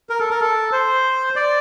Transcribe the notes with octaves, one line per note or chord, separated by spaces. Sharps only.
A#4
A4
A#4
A4
C5
D5